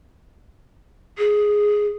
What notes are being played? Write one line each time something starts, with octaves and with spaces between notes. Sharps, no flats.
G#4